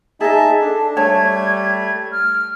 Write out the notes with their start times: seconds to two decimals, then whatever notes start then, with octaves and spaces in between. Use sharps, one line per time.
0.21 D#4 G#4 D#5 E5 A5
0.61 D4 A4
0.97 G3 A3 C#5 A5 G#6
2.12 F6